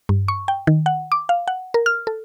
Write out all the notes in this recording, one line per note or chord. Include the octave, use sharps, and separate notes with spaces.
G2
C#6
G5
D#3
F#5
D6
F5
F#5
A#4
F6
A4